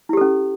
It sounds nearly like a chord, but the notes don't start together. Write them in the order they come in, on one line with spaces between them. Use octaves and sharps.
E4 G4 A4 C#4